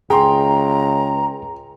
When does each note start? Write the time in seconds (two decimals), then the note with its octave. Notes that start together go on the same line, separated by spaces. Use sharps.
0.10 C#2 G#4 G5 A#5 C6